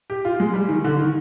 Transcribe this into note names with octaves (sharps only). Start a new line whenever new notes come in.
G4
F4
G#3
G3
D#3
D3
D#3